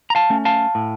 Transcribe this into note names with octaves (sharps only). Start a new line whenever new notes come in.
A#5
F5 A5
A3 C#4
F5 A5
A2